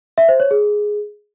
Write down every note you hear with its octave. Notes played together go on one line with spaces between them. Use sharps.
E5
C5
C#5
G#4